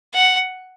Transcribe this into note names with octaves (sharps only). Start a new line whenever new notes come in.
F#5